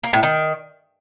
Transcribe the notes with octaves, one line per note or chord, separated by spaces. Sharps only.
A#3
A2
D#3